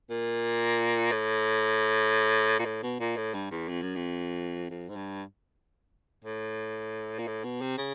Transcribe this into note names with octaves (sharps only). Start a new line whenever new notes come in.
A#2
A2
A#2
A2
B2
A#2
A2
G2
E2
F2
F#2
F2
F2
G#2
G2
A2
A#2
A2
B2
C3
C#3